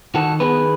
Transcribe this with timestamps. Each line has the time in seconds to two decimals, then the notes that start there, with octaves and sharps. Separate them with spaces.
0.15 D#3 F#4 A4
0.40 B3 G#4 B4